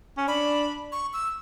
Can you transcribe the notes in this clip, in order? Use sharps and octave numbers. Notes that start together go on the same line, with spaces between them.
C#4
D4 B5
C#6
E6